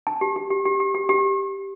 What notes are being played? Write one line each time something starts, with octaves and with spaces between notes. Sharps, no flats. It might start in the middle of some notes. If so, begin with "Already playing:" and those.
A5
G4
G4
G4
G4
G4
G4
G4